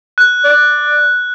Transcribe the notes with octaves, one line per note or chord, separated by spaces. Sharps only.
F#6
D5